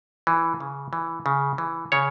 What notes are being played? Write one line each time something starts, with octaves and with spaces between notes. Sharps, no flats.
E3
C#3
E3
C#3
E3
C#3 C#5